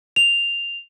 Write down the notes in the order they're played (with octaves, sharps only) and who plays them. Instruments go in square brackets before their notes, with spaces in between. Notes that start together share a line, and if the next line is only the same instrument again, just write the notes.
[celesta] F7